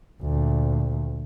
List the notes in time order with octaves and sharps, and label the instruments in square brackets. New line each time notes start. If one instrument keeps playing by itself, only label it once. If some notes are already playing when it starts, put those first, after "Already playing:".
[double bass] D2 A#2